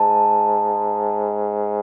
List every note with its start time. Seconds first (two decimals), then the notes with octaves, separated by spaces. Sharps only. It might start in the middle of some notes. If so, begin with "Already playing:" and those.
Already playing: G#2 A5